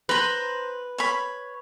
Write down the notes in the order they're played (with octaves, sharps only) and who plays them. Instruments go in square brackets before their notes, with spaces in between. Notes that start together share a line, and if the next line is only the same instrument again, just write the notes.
[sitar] B4 [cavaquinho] C5 A#5
[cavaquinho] C#5 B5